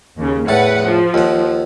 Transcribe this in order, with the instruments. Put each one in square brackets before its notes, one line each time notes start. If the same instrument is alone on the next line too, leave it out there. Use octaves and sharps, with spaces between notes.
[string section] D#2 C#3
[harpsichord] E2 A2 A5 [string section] B4 F#5
[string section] F3
[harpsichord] D#2 F#5